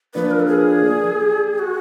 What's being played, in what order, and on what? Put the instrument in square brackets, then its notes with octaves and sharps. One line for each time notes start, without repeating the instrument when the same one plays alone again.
[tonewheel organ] F3 A#3 D4 [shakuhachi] B4
[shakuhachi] A#4
A4
G#4
F#4